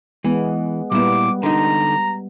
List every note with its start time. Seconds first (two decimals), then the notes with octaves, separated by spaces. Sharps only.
0.24 E3 G#3 B3
0.92 A#2 G3 B3 E4 D6
1.43 D3 D#4 A#5